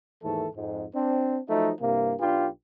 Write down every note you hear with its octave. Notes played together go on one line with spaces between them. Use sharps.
D#2 G#2 E3 A3 A4
F2 G#2
C4 D4
F3 F#3 A3 D#4
C2 G2 C3 A#3
B1 D4 F4 G4 B4